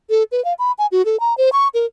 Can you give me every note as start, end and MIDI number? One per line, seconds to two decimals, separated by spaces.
0.10 0.23 69
0.32 0.43 71
0.45 0.54 77
0.59 0.72 83
0.78 0.87 80
0.92 1.05 66
1.05 1.19 69
1.20 1.36 82
1.38 1.50 72
1.53 1.68 85
1.74 1.86 70